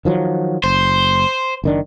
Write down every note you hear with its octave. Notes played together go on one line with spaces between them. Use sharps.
D#3 F3 F#3
F#1 C5
F#1 D#3 D4